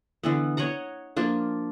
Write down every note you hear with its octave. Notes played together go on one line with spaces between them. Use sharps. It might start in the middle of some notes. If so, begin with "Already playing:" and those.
D3 E3 B3
C#5 D#5 F#5 A#5
F3 A#3 D4 F4